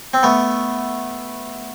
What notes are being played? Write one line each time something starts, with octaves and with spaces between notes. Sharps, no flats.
C4
A3 B3